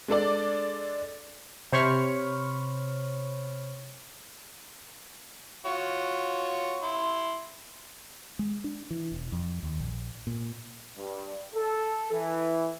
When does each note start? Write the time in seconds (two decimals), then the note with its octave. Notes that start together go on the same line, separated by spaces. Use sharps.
0.08 G#3 D4 A4 D5
1.72 C3 C5 C#5 B5 C#6 F6
5.66 F4 F#4 C#5
6.83 E4 C6
8.39 G#3
8.64 D4
8.91 E3
9.12 E1
9.32 F2
9.63 D#2
9.80 A#1
10.27 A#2
10.97 G2
11.55 A4
12.12 E3